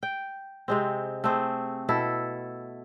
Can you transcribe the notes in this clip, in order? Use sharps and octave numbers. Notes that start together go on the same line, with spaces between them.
G5
C3 G#3 C4
A3 C4 G#4
B2 E4 A4